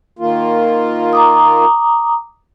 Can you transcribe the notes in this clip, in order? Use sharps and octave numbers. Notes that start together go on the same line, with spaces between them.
D#3 A#3 F4
A#5 D6 D#6